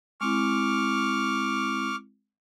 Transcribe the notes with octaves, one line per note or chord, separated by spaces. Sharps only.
G#3 C4 E4 C#6 D6 F6